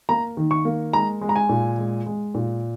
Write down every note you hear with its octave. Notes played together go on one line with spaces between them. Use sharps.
A#3 A#5
D#3
C#6
A#3
G#3 A#5
G#3
A#5
G#5
A#2
G#3
G#3
A#2